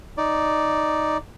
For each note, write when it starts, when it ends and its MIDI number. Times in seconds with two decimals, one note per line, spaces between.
0.17 1.17 63
0.17 1.17 74